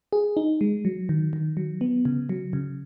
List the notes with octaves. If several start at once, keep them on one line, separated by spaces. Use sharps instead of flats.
G#4
D#4
G#3
F#3
D#3
D#3
F#3
B3
C#3
F#3
C#3